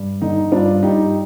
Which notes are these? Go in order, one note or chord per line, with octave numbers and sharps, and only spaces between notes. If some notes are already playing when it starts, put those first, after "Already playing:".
Already playing: G2
D3 D#4
G2 D4 F4
G2 D#4 G4